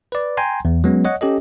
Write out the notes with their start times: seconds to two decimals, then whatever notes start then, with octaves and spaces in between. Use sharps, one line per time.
0.12 B4 D5
0.37 G5 G#5 A#5 C6
0.65 E2
0.84 F#3 G#3 B3 C#4
1.05 C#5 D#5 F#5
1.21 C#4 G4 A4 D#5